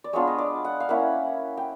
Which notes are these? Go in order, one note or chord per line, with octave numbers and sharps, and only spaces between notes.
D5
G#3 B3 D4 F4 C#5
D#5
D5
F#5
F5
A#3 C#4 E4 F#5
G5